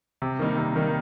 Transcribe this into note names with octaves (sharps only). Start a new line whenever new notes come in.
C3
D#3 G3 A#3 D#4
C3
D#3 G3 A#3 D#4